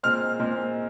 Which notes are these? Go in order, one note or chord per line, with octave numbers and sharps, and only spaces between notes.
A#2 G#3 C4 F6
A#2 G#3 C4